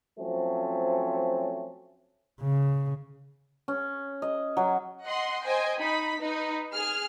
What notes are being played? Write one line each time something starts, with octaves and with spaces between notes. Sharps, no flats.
F3 F#3 A3 C4 C#4
C#3
C#4
D#5
F#3
D#5 F#5 C6
C5 D#5 G5 G#5
D#4 B5 B6
D#4 B4
G#4 F6